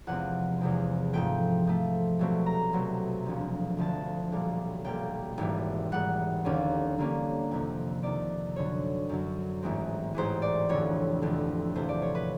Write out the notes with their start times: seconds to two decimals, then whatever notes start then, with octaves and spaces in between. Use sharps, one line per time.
0.07 E2 C3 F3 G#3 C4 F#5
0.61 E2 C3 F3 G#3 C4
1.13 G#2 F3 A3 G5
1.65 G#2 F3 A3
2.19 C2 B2 F#3 A3 C4
2.46 A#5
2.73 C2 B2 F#3 A3 C4
3.26 E1 D2 D3 F3
3.77 E1 D2 D3 F3 A5
4.32 B1 A#2 G3 A#3
4.84 B1 A#2 G3 A#3 G5
5.38 G#1 G#2 E3 G3
5.92 G#1 G#2 E3 G3 F#5
6.44 D#2 D3 G3 A#3 C#4
6.98 D#2 D3 G3 A#3 C#4
7.51 F2 C3 D#3
8.02 F2 C3 D#3 D5
8.56 F#2 D3 F#3 C#5
9.09 F#2 D3 F#3
9.62 A1 G#2 E3 G#3 C4
10.14 A1 G#2 E3 G#3 C4 C5
10.42 D5
10.69 F1 F2 D3 C#5
11.22 F1 F2 D3
11.75 E2 C3 F3 A3 C5
11.89 D5
12.02 C#5
12.15 B4